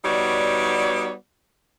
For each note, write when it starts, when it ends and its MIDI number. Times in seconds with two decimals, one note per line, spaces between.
0.05 1.12 55
0.05 1.12 59
0.05 1.12 63
0.05 1.12 66
0.05 1.12 73
0.05 1.12 74